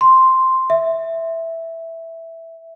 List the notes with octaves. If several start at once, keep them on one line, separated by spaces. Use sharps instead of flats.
C6
E5